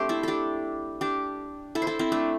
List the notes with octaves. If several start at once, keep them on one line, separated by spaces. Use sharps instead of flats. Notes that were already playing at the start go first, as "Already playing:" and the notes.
Already playing: A3 C4 D4 G4 C5
E4 A4
D4 G4 A4
D4 G4
E4 A4
C5
E4 A4
C4 E4
A3 D4